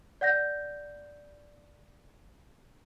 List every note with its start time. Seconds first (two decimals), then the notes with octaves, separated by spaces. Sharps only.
0.21 D5 F#5 G6 A#6